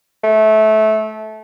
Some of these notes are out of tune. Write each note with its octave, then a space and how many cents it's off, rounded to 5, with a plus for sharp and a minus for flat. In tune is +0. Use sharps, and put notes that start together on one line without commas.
A3 -20